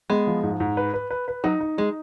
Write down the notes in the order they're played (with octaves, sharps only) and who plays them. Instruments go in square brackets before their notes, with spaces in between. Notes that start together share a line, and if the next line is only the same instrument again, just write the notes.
[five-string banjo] G#3 [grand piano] B3
[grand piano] F3
G#2
G#2
B4
B4
B4
B4
[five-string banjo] F#3 [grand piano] D#4
[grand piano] D#4
[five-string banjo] G#3 [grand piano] D#4